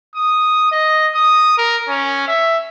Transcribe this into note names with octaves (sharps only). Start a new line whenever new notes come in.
D#6
D#5
D#6
A#4
C#4
E5